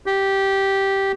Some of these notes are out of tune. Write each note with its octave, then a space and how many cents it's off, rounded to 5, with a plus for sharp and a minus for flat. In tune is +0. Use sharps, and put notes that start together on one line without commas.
G4 -10